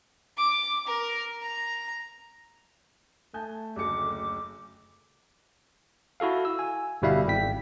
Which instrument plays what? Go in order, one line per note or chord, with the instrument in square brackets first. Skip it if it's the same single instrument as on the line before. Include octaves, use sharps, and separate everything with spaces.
[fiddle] D6
A#4
A#5
[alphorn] A3 [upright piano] G#5 A5 G6
[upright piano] F#1 D2 C#7 [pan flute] D6
[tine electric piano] E4 F#4 A4 F5
E6
G#5
G1 B2 G3 E4 E5 F5
G#1 G5 B6